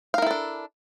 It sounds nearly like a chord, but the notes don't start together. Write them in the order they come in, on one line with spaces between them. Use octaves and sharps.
F5 A#4 E4 A4 D4